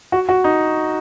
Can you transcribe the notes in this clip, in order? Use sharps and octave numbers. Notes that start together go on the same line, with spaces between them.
F#4
F#4
D#4